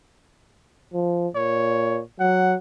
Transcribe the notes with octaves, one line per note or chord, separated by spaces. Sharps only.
F3
A#2 C#5
F#3 F#5